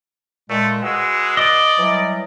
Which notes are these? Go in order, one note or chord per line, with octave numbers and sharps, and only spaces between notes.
A#2 G#3 A3
G#3 F#4 B4 E6
D5 D#5
E3 F#3 G3